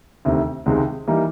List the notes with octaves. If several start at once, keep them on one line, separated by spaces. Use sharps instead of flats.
D2 C3 D#3
C#2 C3 D#3 G#3
E3 G3 A#3 D#4